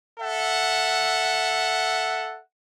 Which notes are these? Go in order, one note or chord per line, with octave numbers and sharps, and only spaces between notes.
A4 E5 F#5